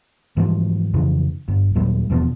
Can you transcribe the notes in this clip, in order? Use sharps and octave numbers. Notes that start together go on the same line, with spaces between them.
G#2 E3 F3 G3
F2 C#3 E3
G1
D#2 A#2 F#3 G3
E1 E2 B2 F3